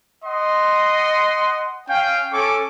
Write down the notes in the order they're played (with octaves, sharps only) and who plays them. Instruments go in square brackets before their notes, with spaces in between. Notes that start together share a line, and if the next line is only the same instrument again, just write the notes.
[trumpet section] D#5 F#5 C6
C#4 F5 G5
C#4 A4 G#5 C#6 D6